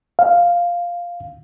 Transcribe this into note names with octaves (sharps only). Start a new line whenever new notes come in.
F5